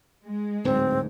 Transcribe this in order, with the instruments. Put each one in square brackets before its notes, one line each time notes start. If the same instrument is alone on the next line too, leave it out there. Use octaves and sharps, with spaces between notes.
[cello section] G#3
[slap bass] D1 G#2 [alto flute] C4